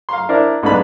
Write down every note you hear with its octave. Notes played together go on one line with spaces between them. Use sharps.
F5 A#5 C6
D4 E4 A#4 C5 D5
B1 G#2 D4 D#4 B4 B5